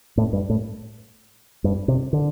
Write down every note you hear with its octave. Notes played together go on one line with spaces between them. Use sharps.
A2
G2
A2
G2
C3
D3